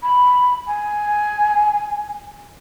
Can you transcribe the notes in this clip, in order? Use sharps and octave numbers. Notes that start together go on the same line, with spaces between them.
B5
G#5